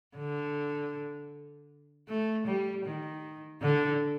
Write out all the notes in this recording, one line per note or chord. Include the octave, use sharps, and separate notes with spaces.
D3
A3
G3
D#3
D3